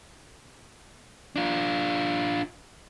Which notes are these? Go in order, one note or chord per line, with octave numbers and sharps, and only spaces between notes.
D4 F4